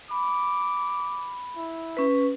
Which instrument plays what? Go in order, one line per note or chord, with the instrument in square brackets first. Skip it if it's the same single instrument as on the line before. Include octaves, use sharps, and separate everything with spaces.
[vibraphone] B5 [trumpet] D6
[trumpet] E4
[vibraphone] C#4 B4